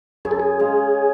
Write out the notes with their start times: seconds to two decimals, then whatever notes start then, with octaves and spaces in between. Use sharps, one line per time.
0.25 F#2 G#4
0.31 A4
0.40 G#4
0.59 C#3 G#3 C#4